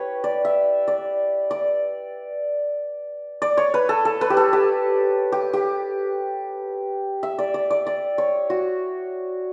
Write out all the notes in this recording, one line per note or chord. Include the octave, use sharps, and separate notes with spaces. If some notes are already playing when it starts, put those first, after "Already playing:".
Already playing: G4 B4 C#5
D5
E5
D5
D5
D5
C#5
B4
A4
A4
B4
G4
A4
G4
G4
G4
E5
D5
D5
D5
D5
C#5
F#4